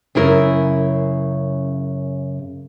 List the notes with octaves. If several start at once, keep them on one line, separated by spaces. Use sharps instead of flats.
F#2 C#3 E4 A#4